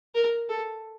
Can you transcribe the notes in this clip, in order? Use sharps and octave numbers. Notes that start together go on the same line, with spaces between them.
A#4
A4